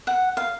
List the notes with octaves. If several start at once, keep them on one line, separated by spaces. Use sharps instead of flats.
F#5
F5